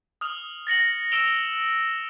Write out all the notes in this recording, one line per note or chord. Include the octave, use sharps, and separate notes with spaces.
D#6 F6 F7
A6 A#6 C#7 F#7
E6 D7 E7 F7 G7